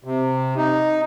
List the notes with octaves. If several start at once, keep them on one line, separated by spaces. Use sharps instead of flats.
C3
D#4